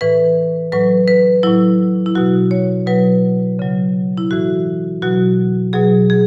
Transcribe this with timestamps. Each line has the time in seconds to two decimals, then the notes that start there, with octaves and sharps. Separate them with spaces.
0.01 A2 E3 B4
0.72 A2 F#3 B4
1.08 B4
1.43 A2 F#3 E4
2.06 E4
2.15 B2 F#3 F#4
2.51 C#5
2.86 B2 F#3 B4
3.59 C#3 F#3
4.17 E4
4.31 A2 E3 F#4
5.02 B2 F#3 F#4
5.73 B2 F#3 G#4
6.10 G#4